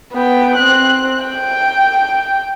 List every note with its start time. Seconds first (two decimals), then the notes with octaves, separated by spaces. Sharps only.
0.12 B3 G5
0.56 C4 F#6
1.23 G5